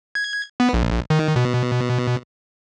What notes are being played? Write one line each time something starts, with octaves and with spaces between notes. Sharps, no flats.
G#6
B3
A#1
D#3
B2